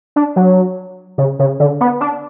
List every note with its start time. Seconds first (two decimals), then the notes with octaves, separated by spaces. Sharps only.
0.16 D4
0.36 F#3
1.18 C#3
1.39 C#3
1.60 D3
1.81 B3
2.01 D4